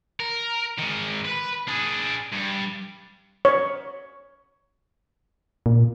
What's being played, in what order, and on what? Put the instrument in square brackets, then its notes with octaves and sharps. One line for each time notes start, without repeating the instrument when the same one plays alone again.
[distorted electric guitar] A#4
D#3 G#3
B4
D4 G#4
G2
[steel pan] C#5
[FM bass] A#2